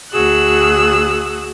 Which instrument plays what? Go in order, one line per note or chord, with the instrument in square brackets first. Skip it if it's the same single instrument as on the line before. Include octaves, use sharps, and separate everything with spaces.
[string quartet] D2 F#4 G#4 E6 F#6